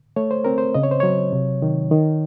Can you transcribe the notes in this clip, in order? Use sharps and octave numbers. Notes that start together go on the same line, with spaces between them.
A3 C#5
C5
C4 A#4
C5
C#3 D#5
C#5
C5
F#3 C#5
C3
D#3
D#3